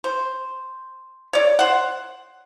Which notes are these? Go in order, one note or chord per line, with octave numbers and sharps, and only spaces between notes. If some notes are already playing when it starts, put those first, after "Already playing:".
C5
C#5 D5
C5 F#5